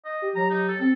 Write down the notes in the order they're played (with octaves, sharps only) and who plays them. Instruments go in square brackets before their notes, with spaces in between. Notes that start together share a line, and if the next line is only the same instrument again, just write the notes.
[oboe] D#5
[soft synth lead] G4
[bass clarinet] F#3 [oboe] A#5
[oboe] D#4
A4
[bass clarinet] C4 [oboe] A4